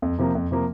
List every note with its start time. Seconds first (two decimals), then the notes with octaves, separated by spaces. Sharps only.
0.02 F2
0.18 C3 F3 A#3
0.35 F2
0.51 C3 F3 A#3